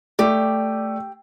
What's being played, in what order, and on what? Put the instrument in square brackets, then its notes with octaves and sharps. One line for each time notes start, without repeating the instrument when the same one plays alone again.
[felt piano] A3 [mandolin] G4 [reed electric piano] D5